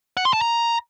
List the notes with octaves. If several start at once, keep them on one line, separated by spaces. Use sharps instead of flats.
F#5
C6
A5
A#5